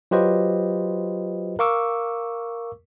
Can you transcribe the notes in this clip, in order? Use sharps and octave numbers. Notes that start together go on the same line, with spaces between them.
F#3 F4 G4 B4 C5 D#5
A#4 F5 C#6 D6 E6